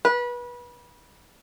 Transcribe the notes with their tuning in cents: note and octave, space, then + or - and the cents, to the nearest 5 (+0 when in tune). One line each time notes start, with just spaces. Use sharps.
B4 -25